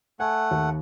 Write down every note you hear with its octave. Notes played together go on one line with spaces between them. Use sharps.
A3 F#5 G#5
D#2